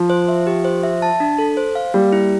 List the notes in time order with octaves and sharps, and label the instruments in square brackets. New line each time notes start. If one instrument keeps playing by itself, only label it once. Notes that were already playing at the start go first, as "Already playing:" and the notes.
Already playing: [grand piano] F3
[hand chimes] C5
E5
G4
C5
E5
A5
D4
A4
C5
F5
[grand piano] G3 [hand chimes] A#3
[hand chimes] E4